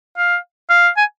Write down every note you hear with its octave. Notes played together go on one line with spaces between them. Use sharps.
F5
F5
G#5